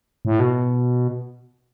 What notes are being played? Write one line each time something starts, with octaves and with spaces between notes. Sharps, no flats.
A2
B2